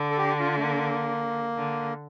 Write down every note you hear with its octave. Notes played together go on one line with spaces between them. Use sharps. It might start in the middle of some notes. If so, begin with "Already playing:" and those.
Already playing: D3
A4
G4
F4
A3
A#3
D3